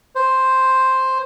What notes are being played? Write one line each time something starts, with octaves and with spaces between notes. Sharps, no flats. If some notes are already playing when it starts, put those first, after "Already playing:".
C5